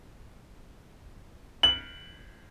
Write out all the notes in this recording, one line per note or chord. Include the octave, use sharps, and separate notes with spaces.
F#7